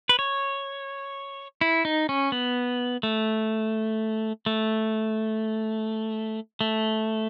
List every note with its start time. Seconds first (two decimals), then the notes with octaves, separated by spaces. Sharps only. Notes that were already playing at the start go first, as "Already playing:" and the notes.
0.09 B4
0.19 C#5
1.61 E4
1.85 D#4
2.09 C#4
2.32 B3
3.03 A3
4.46 A3
6.61 A3